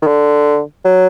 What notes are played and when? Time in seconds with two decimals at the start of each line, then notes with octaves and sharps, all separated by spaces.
0.02 D#3
0.07 D3
0.84 F#3